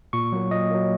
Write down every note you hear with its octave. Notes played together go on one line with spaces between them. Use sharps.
A#2 C#6
F#3 A#3
A#2 D#5
F#3 A#3